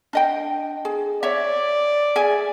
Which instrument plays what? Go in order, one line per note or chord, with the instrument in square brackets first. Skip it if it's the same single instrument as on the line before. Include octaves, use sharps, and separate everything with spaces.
[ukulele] D4 D#5 G5
G#4
[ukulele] C#5 E5 [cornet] D5
[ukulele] G#4 E5 G#5